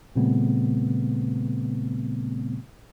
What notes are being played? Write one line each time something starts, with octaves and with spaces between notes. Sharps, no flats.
A#2 C#3 G3 A3 B3 C4